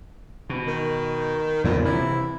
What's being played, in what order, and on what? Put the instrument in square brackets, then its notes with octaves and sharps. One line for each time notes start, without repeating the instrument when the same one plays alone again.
[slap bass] B2
[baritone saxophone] D#3
[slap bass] E2 C#3 B3 [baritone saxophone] A#2
[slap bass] C3 E3 [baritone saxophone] E4